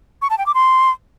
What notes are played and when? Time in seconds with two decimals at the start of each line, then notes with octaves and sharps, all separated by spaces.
0.22 C#6
0.30 A5
0.38 G5
0.46 D6
0.54 C6